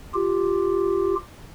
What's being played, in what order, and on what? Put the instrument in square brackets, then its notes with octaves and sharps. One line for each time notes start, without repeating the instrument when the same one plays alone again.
[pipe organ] F4 G4